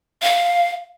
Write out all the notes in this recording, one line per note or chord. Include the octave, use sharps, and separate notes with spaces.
F5